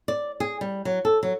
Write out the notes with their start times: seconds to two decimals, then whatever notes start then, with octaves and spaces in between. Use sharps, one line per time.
0.08 D5
0.40 G#4
0.61 G3
0.85 F#3
1.05 A4
1.23 F#3